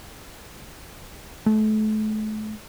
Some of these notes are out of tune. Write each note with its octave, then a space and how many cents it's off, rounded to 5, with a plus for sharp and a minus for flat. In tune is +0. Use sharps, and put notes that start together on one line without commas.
A3 -35